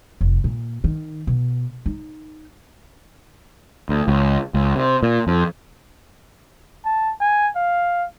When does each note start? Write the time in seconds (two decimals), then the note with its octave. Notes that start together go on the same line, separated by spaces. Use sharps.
0.21 F1
0.44 A#2
0.84 D#3
1.27 B2
1.86 D#4
3.89 D2
4.08 C#2
4.54 C#2
4.76 C3
5.03 A#2
5.27 F2
6.85 A5
7.21 G#5
7.56 F5